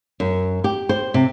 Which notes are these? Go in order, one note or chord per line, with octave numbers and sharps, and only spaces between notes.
F#2
G4
C5
C3